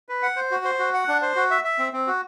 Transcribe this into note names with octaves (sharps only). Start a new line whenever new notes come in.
B4
F#5
C5
F#4
C5
F#4
F#5
D4
C5
F#4
E5
E5
C4
C4
F#4